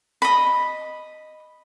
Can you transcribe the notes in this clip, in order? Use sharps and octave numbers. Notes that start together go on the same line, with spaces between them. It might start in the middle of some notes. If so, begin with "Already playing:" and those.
D#5 B5